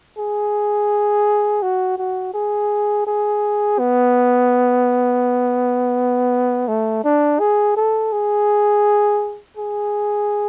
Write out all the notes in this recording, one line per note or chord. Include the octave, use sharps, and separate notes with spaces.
G#4
F#4
F#4
G#4
G#4
B3
A3
D4
G#4
A4
G#4
G#4